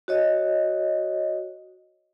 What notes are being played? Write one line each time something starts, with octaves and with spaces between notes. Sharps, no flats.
F#4 C#5 D#5